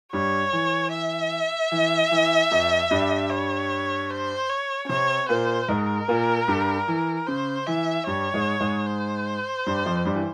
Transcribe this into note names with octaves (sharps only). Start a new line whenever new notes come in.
G2 G3 C#5
E3
E5
E3
E3
F2 F3
G2 G3
C#5
C5
C#5
C#4
C3 C4 C#5
A#2 A#3 C5
G#2 G#3 A#4
A#2 A#3
G2 G3
E3
C#3 C5
E3 E5
G2 G3 C#5
G#2 G#3
G#2 G#3
C5
G2 G3
F2 F3
G2 G3
E3